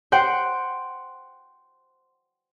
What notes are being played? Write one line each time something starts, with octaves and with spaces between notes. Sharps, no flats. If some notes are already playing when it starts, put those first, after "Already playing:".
C5 F#5 G5